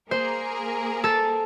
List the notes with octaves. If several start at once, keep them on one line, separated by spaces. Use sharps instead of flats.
A#3 G#4 A#4 C5
A4 A6